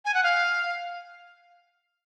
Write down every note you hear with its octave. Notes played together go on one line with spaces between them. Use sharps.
G#5
F#5
F5